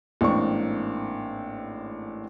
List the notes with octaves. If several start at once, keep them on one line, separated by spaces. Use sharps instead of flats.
A1 G#2 A#3 C4 D4 C#6